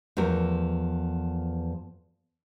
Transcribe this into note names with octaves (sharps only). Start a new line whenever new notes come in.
E2 F3 A3 A#4